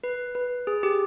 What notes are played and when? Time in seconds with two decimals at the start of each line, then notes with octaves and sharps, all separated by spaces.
0.04 B4
0.35 B4
0.67 G#4
0.83 G4